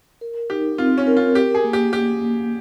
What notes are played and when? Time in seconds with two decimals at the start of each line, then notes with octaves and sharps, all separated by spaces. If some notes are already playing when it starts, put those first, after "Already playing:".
0.21 A#4
0.50 D#4 G4
0.78 C4 F4
0.98 C#4
1.07 A#4
1.17 F4
1.35 G4 A#4
1.55 G#4
1.64 A#3
1.73 G4
1.93 A#3 G4
2.21 A#3